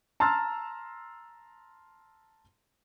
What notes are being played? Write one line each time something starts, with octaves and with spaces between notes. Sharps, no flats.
A5 A#5 C6 E6 F6 A6